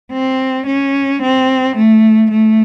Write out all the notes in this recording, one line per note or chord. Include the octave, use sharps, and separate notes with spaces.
C4
C#4
C4
A3
A3